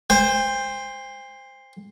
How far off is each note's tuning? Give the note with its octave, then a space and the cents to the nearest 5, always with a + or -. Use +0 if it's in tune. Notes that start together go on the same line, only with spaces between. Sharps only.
C5 +0 G5 +45